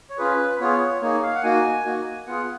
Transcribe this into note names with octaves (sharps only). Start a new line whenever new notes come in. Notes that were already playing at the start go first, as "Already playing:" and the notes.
C#5
C#4 F4 G#4 B4
B3 F4 G#4 C#5
A#3 D#4 G#4 C#5
F5
F#5
A#3 D#4 F#4 G#5
A#3 D#4 F#4
B3 F4 G#4 F#5